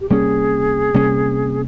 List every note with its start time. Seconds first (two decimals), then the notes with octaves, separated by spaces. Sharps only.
0.01 G4
0.10 C3 G3 A#3 C#4 G#4
0.94 C3 G3 A#3 C#4